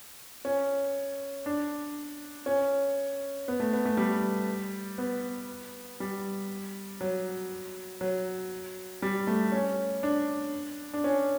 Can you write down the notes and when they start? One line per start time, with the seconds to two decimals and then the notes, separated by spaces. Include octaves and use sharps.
0.45 C#4
1.46 D4
2.46 C#4
3.48 B3
3.60 A3
3.73 B3
3.85 A3
3.97 G3
4.98 B3
6.00 G3
7.01 F#3
8.01 F#3
9.02 G3
9.27 A3
9.52 C#4
10.03 D4
10.93 D4
11.04 C#4